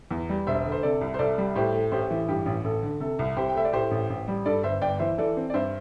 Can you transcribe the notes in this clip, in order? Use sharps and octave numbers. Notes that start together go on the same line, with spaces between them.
E2
G3
E1 C5 E5
D3
C5
C3 A4 D5
C2
C5
C2 A4 D5
G3
A2 G4 C5
A3
A1 G4 C5
E3
G2 G4
A1
A1 A4
D3
C3 A4
C2
C2 G4 C5
G5
A3 E5
D5
A2 G4 C5
A1
A1
G3
G2 A4 D5
G1 C5 E5
G1 D5 G5
E3 C5 E5
E3 A4 D5
C4
D5
G2 C5 E5